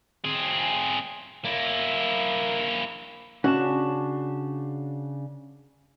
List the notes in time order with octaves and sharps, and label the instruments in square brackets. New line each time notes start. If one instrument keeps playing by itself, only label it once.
[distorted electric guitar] C4 G#4
A#3 E4
[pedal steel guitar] C#3 D4 A5 [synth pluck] C#4 [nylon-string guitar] F#4